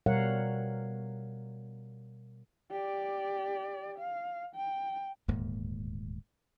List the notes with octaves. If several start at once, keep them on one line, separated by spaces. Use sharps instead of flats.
B2 G3 A#4 C#5 F5 F#5
G4 D5
F5
G5
D#1 D2 G#2 A#3